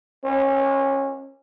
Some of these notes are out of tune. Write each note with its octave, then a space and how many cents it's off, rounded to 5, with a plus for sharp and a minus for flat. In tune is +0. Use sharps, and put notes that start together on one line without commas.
C#4 -25